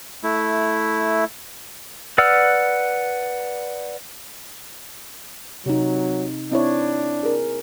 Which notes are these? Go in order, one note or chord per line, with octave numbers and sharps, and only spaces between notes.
A3 E4
B4 D5 F#5 E6 F6
C3 F#3 D#4
C4 D4 E4 C#5
G#4 A#4